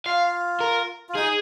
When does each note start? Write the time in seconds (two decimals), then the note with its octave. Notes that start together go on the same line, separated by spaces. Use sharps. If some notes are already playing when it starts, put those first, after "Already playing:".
0.06 F4 F5
0.61 A#4
1.09 F4
1.15 D#4 G#4